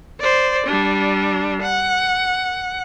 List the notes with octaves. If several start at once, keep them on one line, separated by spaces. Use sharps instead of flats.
C5 D5
G3 D4
F#5